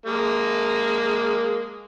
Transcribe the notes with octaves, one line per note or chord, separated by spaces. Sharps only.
G#3 A#3